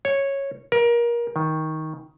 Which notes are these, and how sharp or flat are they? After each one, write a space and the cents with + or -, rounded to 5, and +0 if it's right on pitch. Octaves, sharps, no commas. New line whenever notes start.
C#5 -10
A#4 +25
D#3 +15